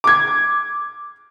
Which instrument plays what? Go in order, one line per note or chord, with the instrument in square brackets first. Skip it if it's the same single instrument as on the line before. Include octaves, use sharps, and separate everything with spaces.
[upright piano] D6 G#6